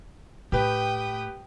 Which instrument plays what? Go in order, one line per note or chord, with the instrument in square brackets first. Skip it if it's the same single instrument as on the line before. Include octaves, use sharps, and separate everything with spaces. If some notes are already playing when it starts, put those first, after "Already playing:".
[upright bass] A2 [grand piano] G4 B4 [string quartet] G5 D#6